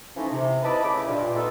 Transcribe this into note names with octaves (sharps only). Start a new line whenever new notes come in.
E3 F3 A3 C#4 D#4
C3
E4 B4 D#5 A5 B5 D6
C#3 A3 B5 D6
G2 A#2
A3 B3 D#4 F4 A4 B4